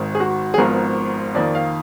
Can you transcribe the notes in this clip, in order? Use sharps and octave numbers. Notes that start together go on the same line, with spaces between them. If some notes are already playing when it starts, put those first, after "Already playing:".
Already playing: G#1 G#2 D#3
G#4
F#4
G#4
G#1 G#2 F3 B3 A#4
F2 D#3 A#3 D5
F5